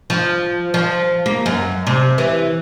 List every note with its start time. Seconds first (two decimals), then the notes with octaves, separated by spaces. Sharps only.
0.10 F3
0.74 F3
1.26 A#3
1.46 F#2
1.87 C3
2.18 E3